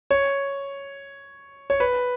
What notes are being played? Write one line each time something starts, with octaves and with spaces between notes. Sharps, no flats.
C#5
C#5
B4